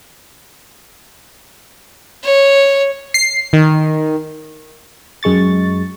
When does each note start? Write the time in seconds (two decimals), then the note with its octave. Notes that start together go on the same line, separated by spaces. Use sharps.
2.24 C#5
3.14 C7
3.53 D#3
5.23 F#2 G#3 C#6 A6